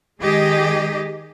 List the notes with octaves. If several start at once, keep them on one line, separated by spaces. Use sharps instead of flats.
D#3 G#3 G4 G#4 D#5